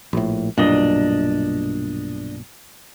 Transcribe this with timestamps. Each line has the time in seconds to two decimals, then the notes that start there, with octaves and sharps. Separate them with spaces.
0.13 A#1 A2
0.58 B1 G2 A#2 D4 D#5